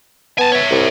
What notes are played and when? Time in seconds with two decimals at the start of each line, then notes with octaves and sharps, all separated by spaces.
0.39 B3 G#5 A5
0.52 C#5 E5
0.70 C2